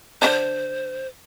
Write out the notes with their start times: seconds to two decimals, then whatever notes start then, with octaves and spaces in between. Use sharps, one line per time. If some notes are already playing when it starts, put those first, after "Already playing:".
0.22 D3 C#4 D4 C5